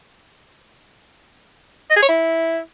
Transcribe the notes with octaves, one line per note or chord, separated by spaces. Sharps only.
D#5
G#4
C#5
E4